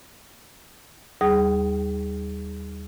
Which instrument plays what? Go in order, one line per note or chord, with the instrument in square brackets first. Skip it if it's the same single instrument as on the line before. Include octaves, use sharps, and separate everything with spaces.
[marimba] D#2 G3 G#4 D#6